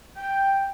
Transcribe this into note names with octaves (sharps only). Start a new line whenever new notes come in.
G5